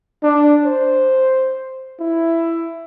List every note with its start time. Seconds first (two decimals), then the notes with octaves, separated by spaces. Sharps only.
0.23 D4
0.65 C5
2.00 E4